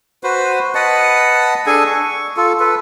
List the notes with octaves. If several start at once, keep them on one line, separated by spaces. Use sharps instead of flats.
F#4 B4 C5
B4 D#5 F#5 A5
D4 G#4 A4 G#5
C#6
F4 A4
A4 B4